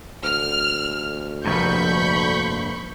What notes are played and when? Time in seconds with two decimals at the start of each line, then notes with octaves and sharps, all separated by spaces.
0.23 D2 F6
1.45 F1 A#1 G2 B5 C#6 G6